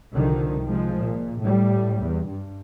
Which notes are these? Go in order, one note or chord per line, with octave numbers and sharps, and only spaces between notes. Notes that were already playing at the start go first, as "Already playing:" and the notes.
C2 D3 D#3 F3
C3 F3 G#3
A#2
A2 G3
E2
G2